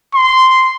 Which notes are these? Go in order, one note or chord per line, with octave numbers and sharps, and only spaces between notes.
C6